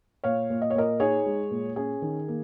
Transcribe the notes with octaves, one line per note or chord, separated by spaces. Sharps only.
A#2 C#5 F5
A#2
D#5
C#5
A#2 A#4 D#5
D#4 G#4 C#5
G#3
A#2
C#4 G#4
D#3
A#3